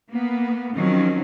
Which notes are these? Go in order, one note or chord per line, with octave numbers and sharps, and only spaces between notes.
A#3 B3
D#3 F3 F#3 C4 C#4